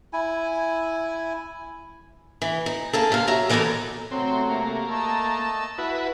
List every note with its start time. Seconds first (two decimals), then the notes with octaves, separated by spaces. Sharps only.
0.13 E4 G#5
2.42 E3
2.66 D#4
2.93 A#3 G#4 A4
3.12 C3 F5
3.27 F#3 E5 A#5
3.49 D3 E3 B3 D#4 A4 A#4
4.11 C3 F#3 A3 C4 F#4
4.50 A#3
4.87 A3 D#5 A5 E6
5.78 E4 F#4 B4